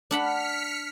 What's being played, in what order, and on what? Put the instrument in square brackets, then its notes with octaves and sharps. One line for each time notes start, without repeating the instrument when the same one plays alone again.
[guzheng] D4 F#5 B5 [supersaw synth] F6 B6 C#7